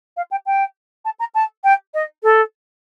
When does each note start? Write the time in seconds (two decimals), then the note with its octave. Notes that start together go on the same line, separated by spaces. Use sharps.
0.17 F5
0.31 G5
0.46 G5
1.05 A5
1.19 A#5
1.34 A5
1.64 G5
1.94 D#5
2.23 A4